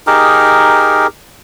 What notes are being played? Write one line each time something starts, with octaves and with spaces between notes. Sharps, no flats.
D#4 G4 G#4 A#4